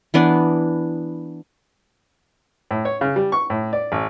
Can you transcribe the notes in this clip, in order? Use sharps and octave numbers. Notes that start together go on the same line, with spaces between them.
E3 B3 D4
A2
C#5
C#3
G3
C#6
A2
D5
A1